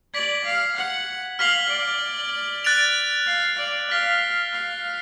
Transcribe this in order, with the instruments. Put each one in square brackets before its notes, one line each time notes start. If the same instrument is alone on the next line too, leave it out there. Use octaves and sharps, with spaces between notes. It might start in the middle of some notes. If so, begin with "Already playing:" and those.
[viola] D5 [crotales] G#6 B6 F#7
[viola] F5
F#5
[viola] F5 [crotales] F6 B6 F#7
[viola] D5
[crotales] F#6 A6 D7 F7
[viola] F5
D5
[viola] F5 [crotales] F6 B6 F7
[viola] F5